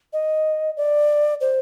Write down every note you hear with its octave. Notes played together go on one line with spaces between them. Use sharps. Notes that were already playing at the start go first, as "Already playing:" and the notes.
D#5
D5
C5